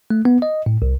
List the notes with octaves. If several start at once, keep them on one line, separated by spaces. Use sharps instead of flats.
A3
B3
D#5
A2
C2